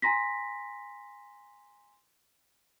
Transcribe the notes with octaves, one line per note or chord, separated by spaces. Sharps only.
G#5 A#5 C6 A#6 B6